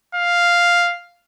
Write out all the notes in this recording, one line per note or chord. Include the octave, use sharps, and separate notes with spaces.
F5